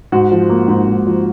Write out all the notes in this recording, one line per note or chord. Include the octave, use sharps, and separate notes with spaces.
G#2 F#4
F3
A#3
G#2
G#2
F3